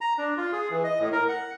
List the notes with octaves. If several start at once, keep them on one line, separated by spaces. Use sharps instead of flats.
A#5
D4
F4
G#4
E3
D#5
A2
A#4
F#5